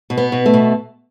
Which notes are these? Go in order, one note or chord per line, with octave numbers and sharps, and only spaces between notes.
B2
B3
B2
A3
B2